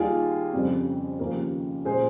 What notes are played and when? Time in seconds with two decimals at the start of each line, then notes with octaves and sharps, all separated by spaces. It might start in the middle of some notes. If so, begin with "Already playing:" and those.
Already playing: D#2 D#3 G3 F4 G#4
0.53 F2 C#3 G3 C4
1.19 D#2 C#3 F3 A#3 C#4
1.85 A#2 G#3 C#4 G#4 C5